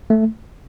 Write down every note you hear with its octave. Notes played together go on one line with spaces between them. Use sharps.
A3